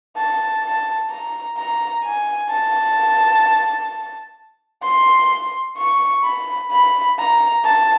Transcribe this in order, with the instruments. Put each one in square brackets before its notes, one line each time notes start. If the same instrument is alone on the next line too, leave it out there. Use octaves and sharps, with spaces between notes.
[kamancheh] A5
A5
A#5
A#5
G#5
A5
C6
C#6
B5
B5
A#5
A5